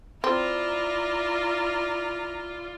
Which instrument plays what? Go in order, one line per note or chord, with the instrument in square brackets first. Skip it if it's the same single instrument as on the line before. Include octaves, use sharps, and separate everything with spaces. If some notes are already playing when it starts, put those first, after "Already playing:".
[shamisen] C4 [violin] E4 D5 [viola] F4 [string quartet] A#5